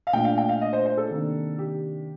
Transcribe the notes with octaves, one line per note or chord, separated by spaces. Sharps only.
F5
A#2 A3 D4 G5
F5
G5
F5
D#5
C5
C5
A4
C3 D#3 A#3 D4
G4